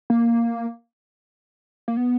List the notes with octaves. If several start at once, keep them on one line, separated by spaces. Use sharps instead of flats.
A#3
A#3
B3